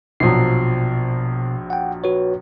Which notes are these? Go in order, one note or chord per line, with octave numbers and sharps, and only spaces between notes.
A#1 B2 F3 F#3 C7
F#5 G5
F#4 B4 C#5